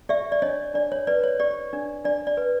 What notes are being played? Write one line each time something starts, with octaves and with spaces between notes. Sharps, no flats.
G4 D5 E5
D5
D4 C#5 D#5
D4 D5
C#5
B4 D5
C#5
G4 D5
D4
D4 D5
D5
B4